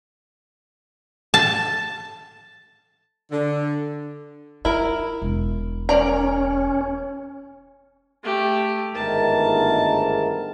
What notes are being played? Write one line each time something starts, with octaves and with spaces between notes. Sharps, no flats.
A5
D3
E4 F4 A#4
E1
C#4 A#4 D5 A#5
A3 G4
G1 G#2 D#3 A3 A#4 A5